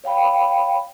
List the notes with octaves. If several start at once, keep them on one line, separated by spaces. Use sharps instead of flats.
C#5 F5 G5 B5